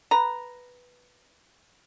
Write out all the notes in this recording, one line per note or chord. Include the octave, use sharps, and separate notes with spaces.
B4 A#5